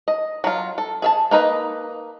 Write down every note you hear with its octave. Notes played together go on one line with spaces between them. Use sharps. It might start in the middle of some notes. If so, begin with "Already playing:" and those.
D#5
F#3 F4
A4
G#4 E5 A5
A#3 D#4 B4 D#5